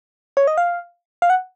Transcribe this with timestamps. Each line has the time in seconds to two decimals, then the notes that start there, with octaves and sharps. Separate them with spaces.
0.37 C#5
0.47 D#5
0.58 F5
1.22 F5
1.30 F#5